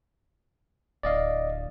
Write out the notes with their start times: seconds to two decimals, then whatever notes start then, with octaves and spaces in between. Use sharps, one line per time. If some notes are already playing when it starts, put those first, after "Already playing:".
1.03 D1 D5 D#5 F5